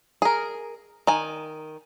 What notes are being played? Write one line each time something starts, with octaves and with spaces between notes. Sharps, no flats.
G#4 A#4
D#3 G#5